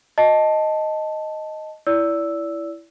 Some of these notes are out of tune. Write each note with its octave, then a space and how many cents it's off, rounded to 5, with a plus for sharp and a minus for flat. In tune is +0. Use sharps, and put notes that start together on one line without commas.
D#5 +0 A5 +0
E4 +10 D5 -30 E6 +0